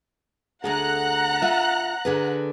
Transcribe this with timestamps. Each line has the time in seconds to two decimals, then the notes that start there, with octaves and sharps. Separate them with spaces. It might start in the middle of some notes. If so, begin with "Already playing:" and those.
0.64 D2 G#4 A4 F#5 A#5 F#6
1.42 F4 E5
2.05 D3 G#4 B4